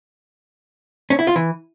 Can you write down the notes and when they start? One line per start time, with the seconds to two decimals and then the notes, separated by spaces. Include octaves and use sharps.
1.10 C#4
1.19 E4
1.27 F4
1.36 E3